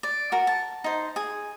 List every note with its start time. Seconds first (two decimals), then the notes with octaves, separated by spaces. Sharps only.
0.03 D5
0.32 F#4 A#4
0.47 A5
0.84 D#4 C5
1.16 G#4